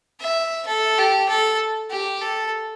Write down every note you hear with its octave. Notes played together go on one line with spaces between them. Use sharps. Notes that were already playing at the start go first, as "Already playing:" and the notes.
E5
A4
G4
A4
G4
A4